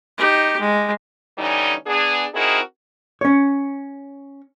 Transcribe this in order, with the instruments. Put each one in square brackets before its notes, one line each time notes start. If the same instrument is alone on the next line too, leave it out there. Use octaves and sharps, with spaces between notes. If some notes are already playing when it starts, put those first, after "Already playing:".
[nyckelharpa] D#4 G4
G#3
[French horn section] D3 E3 G3 C#4 D#4
B3 D4 G#4
C4 D#4 E4 F#4 G#4 A#4
[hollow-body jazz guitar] C#4 C#5